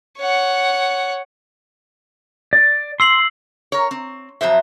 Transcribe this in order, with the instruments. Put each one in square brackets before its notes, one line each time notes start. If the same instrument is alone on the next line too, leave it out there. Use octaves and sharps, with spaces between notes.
[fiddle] C#5 F#5
[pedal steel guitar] D5
[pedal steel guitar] C6 [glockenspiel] E6 C7 F#7
[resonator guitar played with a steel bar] A#4 C#5
C4
F2 F#3 C5 E5